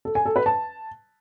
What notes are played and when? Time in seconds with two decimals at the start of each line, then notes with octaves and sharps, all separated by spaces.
0.05 A4
0.15 G#5
0.26 A4
0.36 B4
0.46 A5